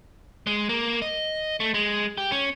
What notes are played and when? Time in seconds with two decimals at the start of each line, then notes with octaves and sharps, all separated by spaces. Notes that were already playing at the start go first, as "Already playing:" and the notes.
0.47 G#3
0.69 A#3
1.02 D#5
1.60 A3
1.74 G#3
2.18 G4
2.32 C#4